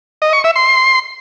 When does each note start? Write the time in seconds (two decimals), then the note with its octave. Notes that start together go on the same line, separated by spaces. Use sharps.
0.22 D#5
0.33 C#6
0.44 E5
0.56 C6